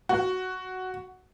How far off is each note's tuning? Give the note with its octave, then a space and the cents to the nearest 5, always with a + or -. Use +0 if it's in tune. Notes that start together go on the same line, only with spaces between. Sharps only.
F#4 +5